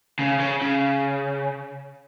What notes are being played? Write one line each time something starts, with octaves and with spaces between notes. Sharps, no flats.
C#3
C#3
C#3